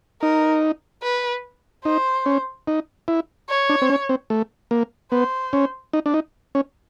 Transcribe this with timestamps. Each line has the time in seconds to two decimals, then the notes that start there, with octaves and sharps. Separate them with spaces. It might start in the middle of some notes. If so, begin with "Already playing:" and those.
0.22 D#4 A#4
1.03 B4
1.85 D#4 C5
2.26 C#4
2.67 D#4
3.08 E4
3.49 C#5
3.69 D4
3.82 C4
3.90 C#4
4.09 C4
4.30 A3
4.71 A#3
5.12 B3 C5
5.53 C#4
5.93 D#4
6.06 D4
6.14 D#4
6.55 C#4